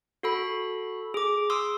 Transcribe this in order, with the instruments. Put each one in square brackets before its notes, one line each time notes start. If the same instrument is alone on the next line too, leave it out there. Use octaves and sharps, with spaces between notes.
[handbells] F#4 A4 B5
G#4 D6
C6 D#6 E6